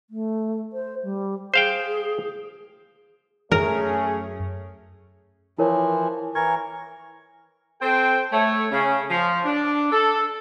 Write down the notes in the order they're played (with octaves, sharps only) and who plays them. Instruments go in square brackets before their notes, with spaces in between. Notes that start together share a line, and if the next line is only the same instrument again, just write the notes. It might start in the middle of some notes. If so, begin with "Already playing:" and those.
[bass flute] A3
C5
G3
[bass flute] G#4 [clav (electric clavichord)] C5 F5 G5
[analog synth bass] F#2 [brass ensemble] A3 C#4 G#4 [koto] A#4
[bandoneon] E3 F3 [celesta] E4 A#4 C#5
[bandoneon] E3 A#4 C#6 [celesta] G#6
[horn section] C4 A4 C5 G5
A3 C#5
C#3 C#4
F3
D4
A4